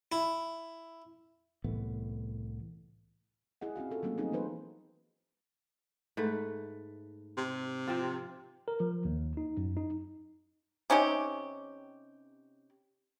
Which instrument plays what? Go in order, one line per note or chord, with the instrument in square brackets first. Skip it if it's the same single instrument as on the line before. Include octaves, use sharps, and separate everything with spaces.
[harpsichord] E4
[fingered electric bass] C2 A2 E3 B3
[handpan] E4 G#4 D#5 F#5
C4 C#4 F#4 F5
F4 A4
F#3 A3 A#3 C4 C#4
G3 A3 C4 D#4 G#4
E3 F3 B3 B4 C5
[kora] G#2 A3 B4
[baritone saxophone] C3
[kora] F3 C4 F4
[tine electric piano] A#4
F3
D#2
D#4
F#2
D#4
[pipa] C3 C#4 D#4 G4